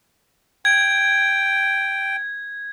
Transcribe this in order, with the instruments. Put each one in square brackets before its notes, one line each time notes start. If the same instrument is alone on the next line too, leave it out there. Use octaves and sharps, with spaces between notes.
[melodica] G5 [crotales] G#6